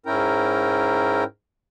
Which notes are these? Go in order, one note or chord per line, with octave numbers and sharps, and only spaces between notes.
G#2 C#4 E4 A#4 G5